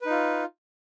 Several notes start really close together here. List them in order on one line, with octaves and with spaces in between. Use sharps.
B4 D#4 F4